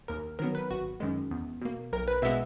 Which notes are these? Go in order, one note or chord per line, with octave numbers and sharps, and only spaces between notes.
D#2 A#4
D#3 F#3 B3 A#4
B4
G#1 F#4
F#2 D#3 G#3
E2
B2 A#3
B1 A#4
B4
B2 G#3 B3 E5